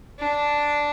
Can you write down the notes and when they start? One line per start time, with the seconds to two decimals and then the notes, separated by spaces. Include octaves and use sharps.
0.19 D4